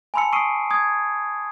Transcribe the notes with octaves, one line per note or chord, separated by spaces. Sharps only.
G#5 A5 B5 C6 E6 C#7
C#6 D#6 E6 C7 D7 D#7
D#6 G#6